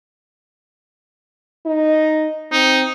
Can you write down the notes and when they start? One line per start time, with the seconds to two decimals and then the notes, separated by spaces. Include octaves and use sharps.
1.66 D#4
2.52 C4 D#4